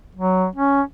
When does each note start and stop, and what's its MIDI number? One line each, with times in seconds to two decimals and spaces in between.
0.15 0.46 54
0.55 0.81 61